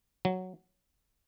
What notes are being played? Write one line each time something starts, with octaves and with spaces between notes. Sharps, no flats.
F#3